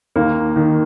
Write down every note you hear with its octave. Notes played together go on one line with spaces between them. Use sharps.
D#2 A#3
D#3